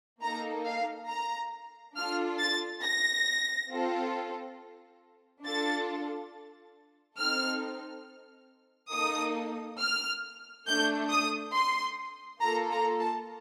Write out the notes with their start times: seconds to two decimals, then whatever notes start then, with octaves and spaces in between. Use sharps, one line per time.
0.22 A#3 D#4 A4 A#5
0.66 F5
1.09 A#5
1.96 D4 F4 A4 F6
2.39 A6
2.83 A#6
3.70 C4 F4 A4
5.44 D4 F4 A4 A6
7.18 C4 D#4 A4 F6
8.93 A#3 D#4 A4 D#6
9.80 F6
10.67 A3 D4 A4 G6
11.10 D#6
11.54 C6
12.41 A#3 F4 A4 A#5
12.71 A#5
12.99 A5